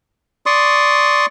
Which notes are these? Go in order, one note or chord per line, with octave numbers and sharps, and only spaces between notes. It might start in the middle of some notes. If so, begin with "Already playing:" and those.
D5 C6 C#6 D#6